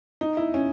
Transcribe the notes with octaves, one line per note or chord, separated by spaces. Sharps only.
D#4
E4
C#4